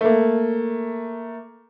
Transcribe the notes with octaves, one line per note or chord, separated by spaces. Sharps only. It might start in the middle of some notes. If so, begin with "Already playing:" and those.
A3 A#3